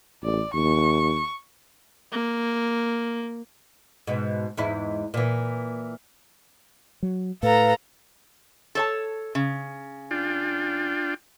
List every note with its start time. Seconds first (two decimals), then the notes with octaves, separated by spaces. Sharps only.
0.23 A1 D5
0.54 D#2 C#6
2.12 A#3
4.07 G#2 B2
4.57 E2 G#2 E4
5.14 A#2 E3
7.03 F#3
7.43 A2 A4 B4 F5 A#5
8.75 A4 C#5 A5
9.35 C#3
10.11 D4 F4 G5